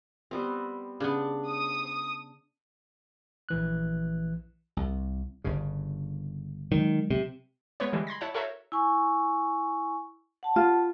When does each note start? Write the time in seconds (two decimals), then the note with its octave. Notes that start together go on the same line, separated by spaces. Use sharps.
0.31 G3 B3 C4
1.00 C#3 B3 D4
1.48 D#6
3.49 A#1 E3 F#6
4.77 C2
5.44 G1 G2 C#3
6.72 D#3 F#3 G#3
7.10 C3
7.80 G#3 B3 B4 C#5
7.92 D3 E3 G3 G#3
8.07 B5 C6 G#6 A#6
8.21 E4 C#5 F#5 A5
8.34 F#4 A4 A#4 C5 C#5 E5
8.72 E4 G#5 C#6
10.43 F#5 A5
10.56 F4